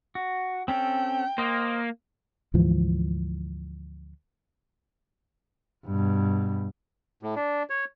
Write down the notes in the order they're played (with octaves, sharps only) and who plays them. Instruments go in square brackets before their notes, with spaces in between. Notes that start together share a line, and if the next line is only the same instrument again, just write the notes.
[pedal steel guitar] F#4
[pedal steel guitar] C4 C#4 A4 [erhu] G5
[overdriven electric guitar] A#3 [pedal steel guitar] C5 D#5
[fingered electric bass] D2 G#2 E3 F3
[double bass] G2 B2
[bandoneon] A2
D4
C#5